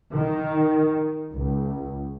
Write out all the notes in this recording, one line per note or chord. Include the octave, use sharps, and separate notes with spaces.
D#3
C#2